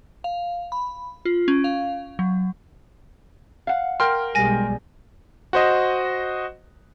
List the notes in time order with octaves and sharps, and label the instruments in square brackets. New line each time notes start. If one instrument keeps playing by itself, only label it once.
[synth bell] F5
B5
F4
C#4
F5
F#3
[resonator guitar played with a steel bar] F5 F#5
[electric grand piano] A#4 G5 C6 [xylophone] F6
[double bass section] B1 G3 G#3 [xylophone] G#5 A#6
[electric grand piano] F#4 C5 D#5